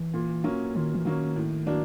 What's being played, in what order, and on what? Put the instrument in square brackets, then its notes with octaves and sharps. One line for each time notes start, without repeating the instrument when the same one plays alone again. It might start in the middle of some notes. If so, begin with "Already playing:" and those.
Already playing: [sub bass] E3
[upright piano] A#2
F#3 A#3 C#4
[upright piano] A#2 [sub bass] D#3
[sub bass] E3
[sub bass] D#3 [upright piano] F#3 A#3 C#4
[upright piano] A2
F#3 A#3 D4